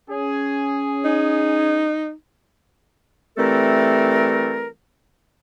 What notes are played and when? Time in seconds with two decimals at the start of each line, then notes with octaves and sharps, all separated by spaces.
0.10 C#4 G#4
1.05 D#4
3.37 E3 G3 A3 C4 A4 A#4